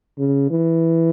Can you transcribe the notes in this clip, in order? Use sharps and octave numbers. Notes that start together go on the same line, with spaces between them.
C#3
E3